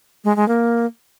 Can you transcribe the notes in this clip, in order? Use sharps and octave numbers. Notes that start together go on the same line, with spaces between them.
G#3
G#3
A#3